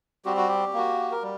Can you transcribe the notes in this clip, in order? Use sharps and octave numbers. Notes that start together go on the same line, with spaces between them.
G3 C4 F#4 G4
F#4
G4
A#3 F#4
A#4
G3